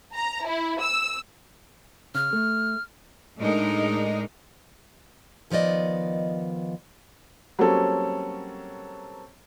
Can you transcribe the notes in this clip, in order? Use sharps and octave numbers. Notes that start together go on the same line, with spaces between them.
A#5
E4
E6
C#3 F6
A3
A2 G#3 D4 D#4 A#4
D#3 F3 B3 D5 D#5
F#3 G3 A#3 C4 C#4 A4